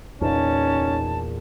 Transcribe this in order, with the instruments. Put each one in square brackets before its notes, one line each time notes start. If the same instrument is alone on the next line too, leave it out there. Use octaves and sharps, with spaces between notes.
[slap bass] E2 A#2 [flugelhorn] C#4 [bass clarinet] D#4 [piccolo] A5